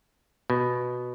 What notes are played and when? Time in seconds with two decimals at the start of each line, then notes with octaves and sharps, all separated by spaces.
0.50 B2